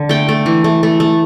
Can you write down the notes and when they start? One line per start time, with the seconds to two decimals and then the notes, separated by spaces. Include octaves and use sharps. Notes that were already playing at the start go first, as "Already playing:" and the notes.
Already playing: D3
0.09 A3 G5
0.29 A3
0.46 E3
0.64 A3
0.83 A3
1.00 A3